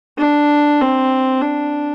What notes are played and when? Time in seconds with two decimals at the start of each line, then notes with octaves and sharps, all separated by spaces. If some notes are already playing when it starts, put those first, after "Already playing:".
0.19 D4
0.81 C4
1.42 D4